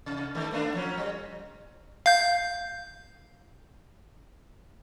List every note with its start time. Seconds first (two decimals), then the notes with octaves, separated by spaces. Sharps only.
0.06 C3
0.35 D#3 G3 A3
0.52 A3 B3 D4
0.74 F3 F#3 C#4
0.97 G3
2.06 F5 G6